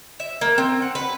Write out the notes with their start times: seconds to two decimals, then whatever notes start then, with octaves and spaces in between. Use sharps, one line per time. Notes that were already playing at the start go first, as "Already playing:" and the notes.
0.20 E5
0.41 A#3
0.58 C4
0.82 F#5
0.95 B4